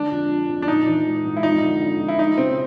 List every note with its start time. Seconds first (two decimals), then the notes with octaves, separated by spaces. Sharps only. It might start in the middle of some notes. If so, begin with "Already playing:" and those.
Already playing: D3 G#3 D4
0.11 F2
0.30 F3
0.48 F2
0.62 D4
0.68 A#1 D#4
0.86 E3
1.06 G#3
1.25 G#2
1.37 E4
1.43 F2 D#4
1.62 D3
1.81 F2
2.00 F2
2.08 E4
2.19 F3 D#4
2.38 C#3 C4